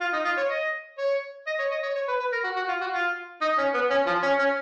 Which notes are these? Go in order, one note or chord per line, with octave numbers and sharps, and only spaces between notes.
F4
D#4
F4
C#5
D#5
C#5
D#5
C#5
D#5
C#5
C#5
B4
B4
A#4
F#4
F#4
F4
F#4
F4
D#4
C#4
B3
C#4
F3
C#4
C#4